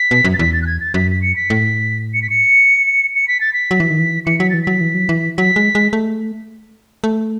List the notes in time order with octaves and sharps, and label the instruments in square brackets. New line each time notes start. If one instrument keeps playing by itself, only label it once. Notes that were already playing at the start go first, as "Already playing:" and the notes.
Already playing: [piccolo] B6
[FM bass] B2
F#2
[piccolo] A6
[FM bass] E2 [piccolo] B6
[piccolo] A6
F#6
G#6
A6
[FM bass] F#2 [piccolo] B6
[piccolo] B6
C#7
B6
[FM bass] A2
[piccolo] C#7
B6
C#7
C#7
B6
A6
B6
[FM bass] F#3
E3
D#3
E3
[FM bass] E3 [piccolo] C#7
[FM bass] F#3 [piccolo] B6
[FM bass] E3 [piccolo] A6
[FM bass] F#3 [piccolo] B6
[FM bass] E3
F#3
E3
[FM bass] F#3 [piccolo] B6
[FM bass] G#3
G#3
A3
A3